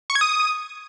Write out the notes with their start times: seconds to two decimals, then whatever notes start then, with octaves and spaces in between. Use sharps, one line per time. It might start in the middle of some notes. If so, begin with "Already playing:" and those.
0.10 C#6
0.15 G#6
0.21 D#6